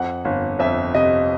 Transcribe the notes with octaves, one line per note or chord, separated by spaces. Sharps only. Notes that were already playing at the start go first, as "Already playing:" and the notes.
Already playing: F2 F#5
G1
F2 E5
C3 D#5